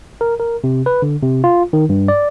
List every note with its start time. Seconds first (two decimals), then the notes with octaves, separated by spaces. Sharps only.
0.21 A#4
0.40 A#4
0.64 C3
0.86 B4
1.02 D3
1.22 C3
1.44 F4
1.73 D#3
1.89 G2
2.08 D5